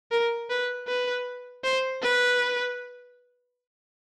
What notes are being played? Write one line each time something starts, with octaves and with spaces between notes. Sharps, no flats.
A#4
B4
B4
C5
B4